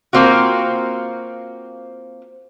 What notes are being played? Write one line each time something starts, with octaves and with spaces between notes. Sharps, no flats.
A#3 C4 F4 F#4